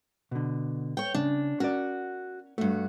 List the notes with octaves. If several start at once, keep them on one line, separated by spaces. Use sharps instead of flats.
B2 D3
C#5 G5
C#3 D4
C#4 F#4 A#4 D5
G2 A3 F#4